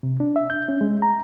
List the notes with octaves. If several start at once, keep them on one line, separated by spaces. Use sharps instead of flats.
C3
D4
E5
G6
C#4
G#3
A#5